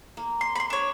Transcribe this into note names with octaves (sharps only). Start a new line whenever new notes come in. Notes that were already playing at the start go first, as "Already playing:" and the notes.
A#3
C6
B5 C6
D4 C#5